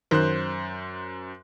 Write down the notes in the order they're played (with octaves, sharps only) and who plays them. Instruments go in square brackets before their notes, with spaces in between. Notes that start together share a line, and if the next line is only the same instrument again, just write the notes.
[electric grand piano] F#2 C5 F#6 [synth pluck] D#3 D#4 A#4